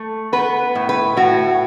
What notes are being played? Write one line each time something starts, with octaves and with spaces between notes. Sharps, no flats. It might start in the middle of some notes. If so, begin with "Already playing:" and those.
Already playing: A3
B3 B4
A2
B4
A2 F#4